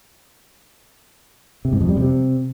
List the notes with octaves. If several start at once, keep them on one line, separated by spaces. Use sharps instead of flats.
C3
G#2
F2
G3
C3